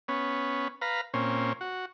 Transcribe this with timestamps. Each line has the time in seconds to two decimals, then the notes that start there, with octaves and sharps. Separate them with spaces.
0.08 B3 C#4
0.82 B4 F5 A#5
1.14 A#2 C4 C#4
1.61 F#4